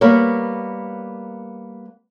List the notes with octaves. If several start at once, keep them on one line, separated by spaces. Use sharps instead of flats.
G3 A#3 B3 A#4 C#5